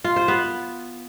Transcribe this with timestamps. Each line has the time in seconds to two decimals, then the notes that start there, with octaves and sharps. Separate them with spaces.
0.04 F4
0.16 C5
0.28 B3